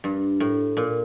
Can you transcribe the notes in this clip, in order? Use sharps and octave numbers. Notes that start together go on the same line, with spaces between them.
G2
A2
A#2